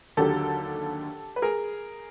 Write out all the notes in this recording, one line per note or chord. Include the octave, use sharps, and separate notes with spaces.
D#2 D3 F#3 G4 A4
B4
G#4 A#4